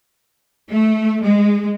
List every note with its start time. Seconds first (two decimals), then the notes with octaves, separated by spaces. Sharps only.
0.71 A3
1.23 G#3